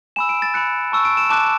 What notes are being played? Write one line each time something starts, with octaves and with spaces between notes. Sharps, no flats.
G#5 B5 E6 E7
D7
A6
B5 F#6 C#7
A5 C#6 E6
D7
E7
A5 D6 F#6 E7